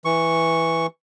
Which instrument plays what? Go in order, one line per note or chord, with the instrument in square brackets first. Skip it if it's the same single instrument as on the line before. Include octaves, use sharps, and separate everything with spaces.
[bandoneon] E3 C#6